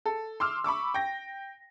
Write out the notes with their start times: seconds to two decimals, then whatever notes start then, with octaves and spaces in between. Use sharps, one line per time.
0.06 A4
0.40 C6 D6 E6 F6
0.64 B5 C#6 D6 E6
0.94 G5 A#6